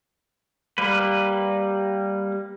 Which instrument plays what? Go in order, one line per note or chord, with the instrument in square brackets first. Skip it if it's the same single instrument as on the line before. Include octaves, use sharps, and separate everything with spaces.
[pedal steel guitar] G3 A#3 B4